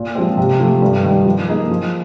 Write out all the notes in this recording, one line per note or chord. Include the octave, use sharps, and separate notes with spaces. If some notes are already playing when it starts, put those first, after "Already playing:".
Already playing: A#2
F3 G#3 C4
C3
F3 A3
G2
D#3 G3
F3
A#3 D#4 G#4
F3